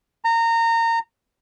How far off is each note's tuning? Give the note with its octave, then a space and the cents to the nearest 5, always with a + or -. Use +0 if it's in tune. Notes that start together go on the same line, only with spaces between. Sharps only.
A#5 -25